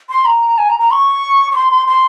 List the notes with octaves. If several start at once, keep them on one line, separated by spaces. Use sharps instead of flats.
C6
A#5
G#5
A#5
A#5
C#6
C#6
C6
C6
C6